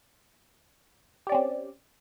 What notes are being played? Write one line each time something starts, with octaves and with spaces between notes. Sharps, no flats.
C4 C#4 G4 D5